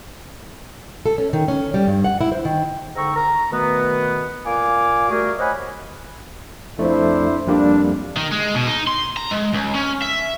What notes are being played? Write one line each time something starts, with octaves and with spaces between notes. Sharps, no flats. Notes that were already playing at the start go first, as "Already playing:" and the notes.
A4
C#4
D#3
C#4
G3
G2
F#5
E4
C5
D#3
G#2 D3 G5 A#5 C#6 E6
A#5
B2 D#3 A3 B3
A#2 F5 G#5 D6
G3 A3 F#4 G#4 A#4
C5 C#5 D#5 F#5 G#5 B5
F2 A3 D4 E4 C5
F2 G3 A#3 D4
D#3
G#3
B2
D#4
C6
A#5
G#3
C#2
C#4
E5